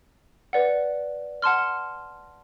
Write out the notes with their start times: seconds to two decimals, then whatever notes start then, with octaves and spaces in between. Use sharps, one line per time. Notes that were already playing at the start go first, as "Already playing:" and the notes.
0.53 B4 D5 F#5
1.42 F#5 A5 C6 F6